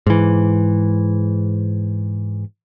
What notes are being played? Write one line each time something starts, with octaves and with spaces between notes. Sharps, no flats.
G#2 E3